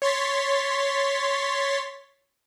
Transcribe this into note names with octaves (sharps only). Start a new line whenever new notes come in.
C#5 C6 A6 B6